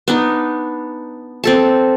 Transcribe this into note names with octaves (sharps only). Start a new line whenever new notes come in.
B3 D4 D#4
C4 A4 A5